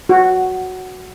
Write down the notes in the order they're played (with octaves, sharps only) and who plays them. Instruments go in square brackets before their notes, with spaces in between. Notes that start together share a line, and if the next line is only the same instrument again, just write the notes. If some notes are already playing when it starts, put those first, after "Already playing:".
[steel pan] F#4